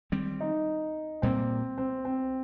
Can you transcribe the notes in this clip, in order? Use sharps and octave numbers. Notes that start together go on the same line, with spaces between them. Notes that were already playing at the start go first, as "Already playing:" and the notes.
D#3 G3 C4
D#4
A#2 G3 A#3 C4
C4
C4